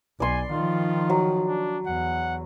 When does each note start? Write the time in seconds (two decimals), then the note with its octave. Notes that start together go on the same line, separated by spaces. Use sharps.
0.20 B1 D5 G#5 C6
0.51 D#3 F3 F4
1.10 F#3
1.47 D4
1.86 E2 F#5